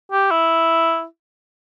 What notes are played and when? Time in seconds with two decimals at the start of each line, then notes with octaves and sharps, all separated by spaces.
0.12 G4
0.31 E4